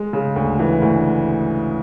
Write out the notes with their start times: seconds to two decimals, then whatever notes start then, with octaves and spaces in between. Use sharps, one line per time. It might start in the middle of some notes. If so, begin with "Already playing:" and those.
Already playing: G#3
0.13 C#3
0.36 D2
0.59 E3
0.82 D2